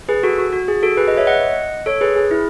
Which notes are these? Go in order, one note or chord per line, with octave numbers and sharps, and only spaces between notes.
G#4 B4
F#4 A4
F#4
F#4
G#4
F#4 A4
G#4 B4
B4 D#5
C#5 E5
D#5 F#5
A4 C#5
G#4 B4
G#4
E4